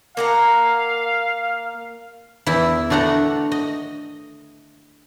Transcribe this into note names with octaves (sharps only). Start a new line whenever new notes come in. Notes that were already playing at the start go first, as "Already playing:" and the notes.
A#3 F5 F#5 A#5
E2 E4
D3 A3 D4 F#5 A#5
D#5